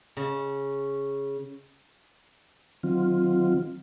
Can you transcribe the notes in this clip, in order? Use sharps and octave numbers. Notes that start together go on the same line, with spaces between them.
C#3
D#3 F#3 C4 F4